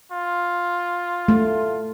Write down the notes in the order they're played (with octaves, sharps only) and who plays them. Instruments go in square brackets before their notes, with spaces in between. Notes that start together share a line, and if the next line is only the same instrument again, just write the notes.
[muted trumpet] F4
[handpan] A3